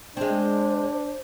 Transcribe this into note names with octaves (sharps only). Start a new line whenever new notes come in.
G#3 C4 D4 C5